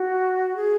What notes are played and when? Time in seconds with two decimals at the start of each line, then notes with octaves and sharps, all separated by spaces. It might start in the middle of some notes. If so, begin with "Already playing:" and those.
Already playing: F#4
0.55 G#4